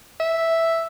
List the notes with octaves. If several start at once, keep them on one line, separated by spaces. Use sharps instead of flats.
E5